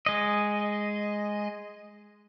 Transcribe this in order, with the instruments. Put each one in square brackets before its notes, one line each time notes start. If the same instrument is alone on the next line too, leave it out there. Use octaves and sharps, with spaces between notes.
[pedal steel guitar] G#3 D#5